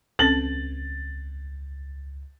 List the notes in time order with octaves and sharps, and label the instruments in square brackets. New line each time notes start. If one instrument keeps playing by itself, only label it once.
[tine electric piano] C#2 [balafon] C4 C#4 A4 [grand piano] A6 F#7